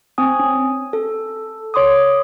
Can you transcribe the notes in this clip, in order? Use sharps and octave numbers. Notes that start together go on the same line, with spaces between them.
C4 G#5 D#6
C#4
A4
C#5 C6 D6 D#6